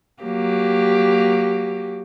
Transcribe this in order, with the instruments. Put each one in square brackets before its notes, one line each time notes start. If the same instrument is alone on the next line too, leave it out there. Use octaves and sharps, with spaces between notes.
[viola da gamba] F#3 A#3 G4